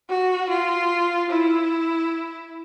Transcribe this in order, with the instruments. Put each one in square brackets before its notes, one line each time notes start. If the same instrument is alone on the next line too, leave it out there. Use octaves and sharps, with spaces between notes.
[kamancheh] F#4
F4
E4